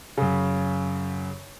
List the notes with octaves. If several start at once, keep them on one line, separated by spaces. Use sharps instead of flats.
F#2 C#3